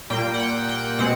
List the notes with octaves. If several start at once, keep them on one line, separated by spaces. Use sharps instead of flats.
A#2 G3 A#3 G5
F#5
G5
G5
B2 G#3 C4 F#5